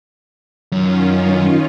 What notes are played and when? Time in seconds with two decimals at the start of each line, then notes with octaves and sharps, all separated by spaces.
0.72 F#2 D#3 C#4 F4